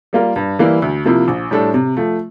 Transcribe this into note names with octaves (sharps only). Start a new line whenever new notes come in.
G3 A#3 F4 A#4
G2
E3 G3 A#3 E4
D2
C3 F3 A#3 E4
A#1
A2 G3 D4 A4
C3
F3 A3